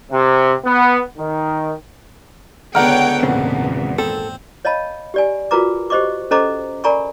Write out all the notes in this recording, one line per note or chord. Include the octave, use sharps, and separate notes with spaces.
C3
B3
D#3
C#2 D3 B3 C#5 F#5 G5 A#5 F6
G#1 E2 A#2 C#3 C4
C4 A4
C#5 D#5 F5 A5 B5
G4 D5 G#5
F4 F#4 A#4 B4 A#5 D6
G4 C5 D#5 C#6 D6
C#4 A4 C5 D#5 A#5 D6
A#4 D5 G#5 A#5 B5 C#6